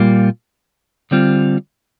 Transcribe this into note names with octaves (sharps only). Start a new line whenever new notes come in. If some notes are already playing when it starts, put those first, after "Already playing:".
Already playing: A#2 G3 A#3 F4
D3 G3 C4 F4